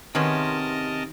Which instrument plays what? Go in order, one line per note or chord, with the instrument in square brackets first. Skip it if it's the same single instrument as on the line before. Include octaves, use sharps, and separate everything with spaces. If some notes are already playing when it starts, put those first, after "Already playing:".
[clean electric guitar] C3 [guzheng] D#3 [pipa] G#3 B3 C#4 [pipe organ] A#4 D#5 A5